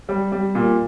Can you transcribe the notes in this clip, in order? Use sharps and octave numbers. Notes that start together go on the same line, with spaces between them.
G3
G3
A#2